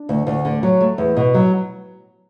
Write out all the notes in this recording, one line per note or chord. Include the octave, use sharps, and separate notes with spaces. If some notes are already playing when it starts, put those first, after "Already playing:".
Already playing: D4
D2
D2
D3
F#3
A3
E2
B2
F#3